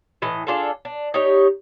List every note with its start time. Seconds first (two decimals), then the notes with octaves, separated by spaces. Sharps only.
0.22 A2 E3 D#5
0.47 D4 F4 G#4 A4
0.85 D4
1.14 D#4 G4 C#5